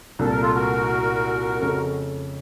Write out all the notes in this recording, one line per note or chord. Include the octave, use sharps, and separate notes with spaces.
C2 A#2 A3 A4
A#4
F4 A4
F#4 A#4
F2 C#3 A3 C#4 A4